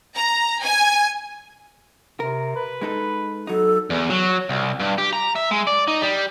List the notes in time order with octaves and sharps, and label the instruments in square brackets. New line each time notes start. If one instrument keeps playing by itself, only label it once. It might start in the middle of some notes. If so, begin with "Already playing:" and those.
[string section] A#5
G#5
[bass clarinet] C3 [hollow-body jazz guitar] A#4
[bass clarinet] B4
[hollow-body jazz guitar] G#3 D#4 A4
[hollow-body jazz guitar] F#3 D#4 [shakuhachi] A4
[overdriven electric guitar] E2
F#3
C2
G2
G4
A#5
E5
G#3
D5
D#4
G3